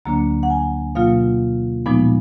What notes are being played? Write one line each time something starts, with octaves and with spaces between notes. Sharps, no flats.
D2 D3 F#3 A#3 D4 A#5
F#5
G#5
B2 F#3 A#3 F4 F5
A#2 F3 G#3 B3 D#4